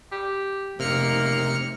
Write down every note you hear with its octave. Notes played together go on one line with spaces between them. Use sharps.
G4
F1 C3 A#3 D#4 F6 C#7